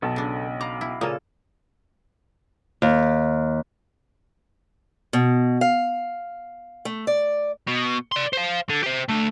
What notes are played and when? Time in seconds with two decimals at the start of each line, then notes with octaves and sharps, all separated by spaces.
0.02 B1 B3 A4 A5
0.16 C#3 D4
0.61 F5 A#5 B5 D6
0.81 E4
1.01 A#2 C#3 A#3 A4 G#5 A#5 D#6
2.82 D#2
5.13 B2
5.61 F5
6.85 A3
7.07 D5
7.68 B2
8.12 D5 C6
8.33 C5 F5
8.69 D3
8.84 G4 C5
9.09 D3 A3